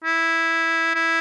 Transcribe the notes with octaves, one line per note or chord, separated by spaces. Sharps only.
E4
E4